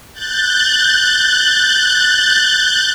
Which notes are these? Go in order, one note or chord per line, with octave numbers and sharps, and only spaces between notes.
F#6 G6 A6